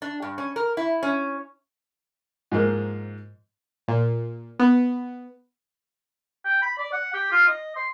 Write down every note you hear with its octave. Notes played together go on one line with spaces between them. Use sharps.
D4
G2
C#4
A#4
E4
C#4
G#2 F3 G#3 A#3
A#2
B3
G5
B5
D5
F#5
G4
F4
D#5
C6